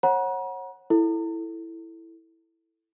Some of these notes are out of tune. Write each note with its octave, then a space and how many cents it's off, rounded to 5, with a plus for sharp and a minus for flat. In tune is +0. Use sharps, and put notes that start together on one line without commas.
C#5 -35 F#5 +0 A#5 +40
E4 +0 A4 +0